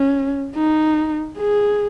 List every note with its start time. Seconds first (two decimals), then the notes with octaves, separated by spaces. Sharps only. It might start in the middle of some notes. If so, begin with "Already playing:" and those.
Already playing: C#4
0.56 D#4
1.38 G#4